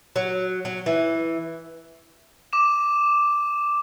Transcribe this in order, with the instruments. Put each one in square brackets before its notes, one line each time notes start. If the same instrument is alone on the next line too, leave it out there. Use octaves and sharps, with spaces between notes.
[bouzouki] F#3
F#3
E3
[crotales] D6 E7